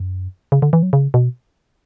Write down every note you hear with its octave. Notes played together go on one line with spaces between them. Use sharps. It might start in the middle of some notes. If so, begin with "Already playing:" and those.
Already playing: F#2
C#3
D3
E3
F#3
C#3
B2